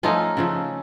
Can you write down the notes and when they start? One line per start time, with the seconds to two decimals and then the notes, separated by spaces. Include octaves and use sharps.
0.03 F3 A3 C#4 D#4 F4
0.37 C#3 F3 A3